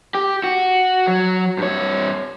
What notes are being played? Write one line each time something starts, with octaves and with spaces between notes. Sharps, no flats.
G4
F#4
F#3
G2 C#5